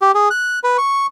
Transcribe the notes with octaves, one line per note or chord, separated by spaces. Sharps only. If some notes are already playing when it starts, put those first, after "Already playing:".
G4
G#4
F#6
B4
C#6